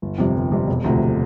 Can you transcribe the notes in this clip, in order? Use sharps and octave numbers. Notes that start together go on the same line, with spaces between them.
G1
F2 C3 G3
G1
F2 C3 G3
E1
D2 C3 F3 A3